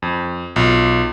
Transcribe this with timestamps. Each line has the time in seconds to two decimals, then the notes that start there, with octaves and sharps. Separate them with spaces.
0.02 F2
0.56 B1 F4